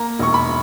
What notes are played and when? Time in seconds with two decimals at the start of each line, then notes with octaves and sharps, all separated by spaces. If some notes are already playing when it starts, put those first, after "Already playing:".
Already playing: A#3 A#5
0.19 E1 C#6
0.34 B5